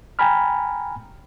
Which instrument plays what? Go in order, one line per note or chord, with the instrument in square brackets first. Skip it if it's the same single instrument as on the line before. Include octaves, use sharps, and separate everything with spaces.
[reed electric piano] G5 G#5 A#5 B5 F6